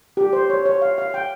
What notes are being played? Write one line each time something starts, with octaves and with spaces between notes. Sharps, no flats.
G4
C5
C#5
C#5
F5
F5
G5